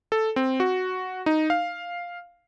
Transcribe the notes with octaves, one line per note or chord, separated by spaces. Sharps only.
A4
C4
F#4
D#4
F5